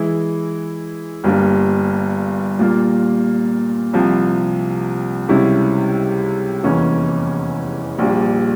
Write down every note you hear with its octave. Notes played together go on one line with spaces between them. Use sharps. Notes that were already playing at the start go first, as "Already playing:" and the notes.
Already playing: E3 G#3 E4
G1 G2 G3 A#3
A#2 G3 A#3 F4
C2 C3 F3
C#2 C3 G3 C#4 E4
F1 E2 E3 A#3 C#4
A#1 A#2 G3